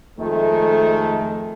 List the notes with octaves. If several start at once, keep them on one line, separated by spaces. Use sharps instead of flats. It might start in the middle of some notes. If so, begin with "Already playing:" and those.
F2 D#3 G#3 A3